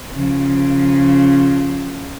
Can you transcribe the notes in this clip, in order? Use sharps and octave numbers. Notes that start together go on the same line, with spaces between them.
C#3 F3